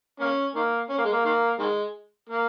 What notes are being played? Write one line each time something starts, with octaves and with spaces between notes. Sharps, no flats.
A#3 C#4
D#3 A#3
C#4
A#3
G#3
A#3
D#3 A#3
D#3 G#3
A#3